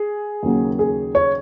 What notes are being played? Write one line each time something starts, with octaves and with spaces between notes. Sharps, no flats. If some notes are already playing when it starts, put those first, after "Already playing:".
Already playing: G#4
D#2 C#3 F#3 A#3
G#4
C#5